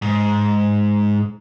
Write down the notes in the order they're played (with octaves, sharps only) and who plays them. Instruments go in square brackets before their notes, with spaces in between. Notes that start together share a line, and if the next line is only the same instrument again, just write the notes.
[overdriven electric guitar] G#2